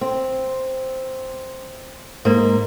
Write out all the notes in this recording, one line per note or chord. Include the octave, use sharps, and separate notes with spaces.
C4
G#2 A#3